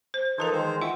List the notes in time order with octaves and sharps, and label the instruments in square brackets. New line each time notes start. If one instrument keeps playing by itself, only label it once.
[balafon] C5
[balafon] E3 A#4 A5 [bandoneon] F3 D#4 A4
[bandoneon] D#3 G#3 C5
[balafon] E4 F4 F#5 [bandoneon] E5 E6